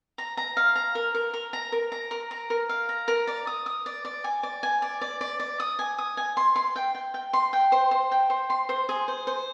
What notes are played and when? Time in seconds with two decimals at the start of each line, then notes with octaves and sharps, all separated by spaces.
0.18 A#5
0.37 A#5
0.57 F5
0.75 A#5
0.95 A#4
1.14 A#4
1.33 A#4
1.53 A#5
1.72 A#4
1.92 A#5
2.11 A#4
2.31 A#5
2.50 A#4
2.69 F5
2.89 A#5
3.08 A#4
3.27 D5
3.47 D#6
3.66 D#6
3.86 D5
4.05 D5
4.24 G#5
4.43 D5
4.63 G#5
4.82 D5
5.01 D5
5.21 D5
5.40 D5
5.60 D#6
5.79 G#5
5.98 D#6
6.17 G#5
6.37 C6
6.56 C6
6.76 G5
6.95 G5
7.14 G5
7.33 C6
7.53 G5
7.72 C5
7.91 C5
8.11 G5
8.30 C5
8.50 C6
8.69 C5
8.89 G#4
9.08 C5
9.27 C5